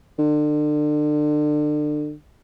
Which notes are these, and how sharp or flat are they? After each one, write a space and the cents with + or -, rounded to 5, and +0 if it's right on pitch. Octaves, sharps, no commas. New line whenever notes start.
D3 +30